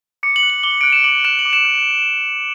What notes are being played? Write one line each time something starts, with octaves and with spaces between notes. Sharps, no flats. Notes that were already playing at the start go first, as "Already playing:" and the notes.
D6 C#7
F#7
F#6
F#7
D6 G7
F#6 D7
E7
D6 F#7
F#6 E7
F#7
D6
E7
F#6